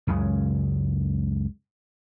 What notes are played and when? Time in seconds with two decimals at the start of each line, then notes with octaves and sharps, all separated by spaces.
0.07 C#2 F#2 C#3 G#3